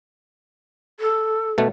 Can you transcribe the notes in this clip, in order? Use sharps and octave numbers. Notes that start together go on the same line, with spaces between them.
A4
B2 A3